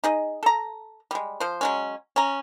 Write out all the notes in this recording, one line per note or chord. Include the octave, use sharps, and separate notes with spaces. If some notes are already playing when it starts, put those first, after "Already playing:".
D#4 G#4 D#5
A4 A#5
G3 G#3
F3 C5
F#3 G#3 C#4
C#4 A#5